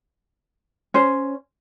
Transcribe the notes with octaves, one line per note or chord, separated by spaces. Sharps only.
C#4 C5